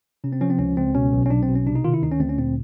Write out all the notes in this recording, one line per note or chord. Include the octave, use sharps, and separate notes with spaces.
C3 C#4
C4
F3 C#4
C4
C#2 C#4
C#2 C4
B2 C#4
B1
C#4
B1 D4
C4
B2
C#4
C3 D4
D#4
D#3 F4
E4
D2 D#4
C#4
D2 C4
C#4
A#2 C4